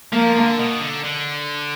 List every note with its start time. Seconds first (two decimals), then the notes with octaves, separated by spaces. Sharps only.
0.13 F3 A#3
0.36 D3
0.59 B2
0.81 D3
1.04 D3